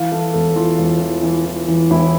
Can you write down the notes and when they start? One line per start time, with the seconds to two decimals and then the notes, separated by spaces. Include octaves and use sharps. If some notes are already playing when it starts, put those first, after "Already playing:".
Already playing: E3 F5
0.12 E3 A4
0.33 E1 A4
0.56 E3 F4
0.78 E1
1.00 E3
1.23 E3
1.46 E3
1.68 E3
1.90 E1 E4